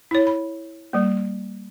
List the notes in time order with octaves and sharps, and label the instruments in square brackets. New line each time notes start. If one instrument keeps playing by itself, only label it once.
[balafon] E4 C#5
B5
G3 A#3